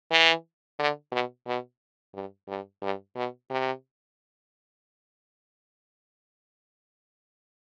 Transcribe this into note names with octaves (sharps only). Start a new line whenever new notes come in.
E3
D3
B2
B2
G2
G2
G2
B2
C3